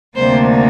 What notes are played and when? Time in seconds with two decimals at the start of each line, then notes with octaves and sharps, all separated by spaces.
0.15 D2 C3 G3 A#3 C5